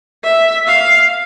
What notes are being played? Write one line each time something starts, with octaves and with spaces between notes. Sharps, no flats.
E5
F5